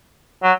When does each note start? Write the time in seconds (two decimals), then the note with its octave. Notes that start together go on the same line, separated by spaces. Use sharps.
0.43 F#3